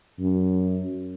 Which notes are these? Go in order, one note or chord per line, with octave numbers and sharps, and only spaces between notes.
F#2